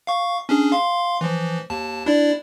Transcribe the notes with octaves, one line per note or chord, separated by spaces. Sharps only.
F5 C#6
C#4 D4 G#4
F5 C6
E3 F3
D#2 A5
D4 E4 D5